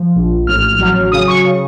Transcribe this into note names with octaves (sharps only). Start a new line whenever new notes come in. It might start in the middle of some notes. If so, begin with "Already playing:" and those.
Already playing: F3
A#1
A1 F6
F#3
C#3 D#6
C#6
C#3